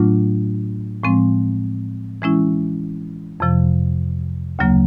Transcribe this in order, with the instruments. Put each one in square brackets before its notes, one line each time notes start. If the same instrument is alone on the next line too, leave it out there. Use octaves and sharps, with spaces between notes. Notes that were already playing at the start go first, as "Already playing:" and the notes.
Already playing: [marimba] A2 F#3 A3 D4 F4
A2 F3 G#3 C4
E3 G#3 C#4 E4
F2 C3 F3
D2 C#3 F#3 A#3